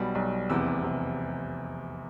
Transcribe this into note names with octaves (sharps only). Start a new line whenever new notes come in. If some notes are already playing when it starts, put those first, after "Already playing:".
Already playing: B1 B2 G3 B5
B1 B2 G3
F1 E2 C3 E6
C3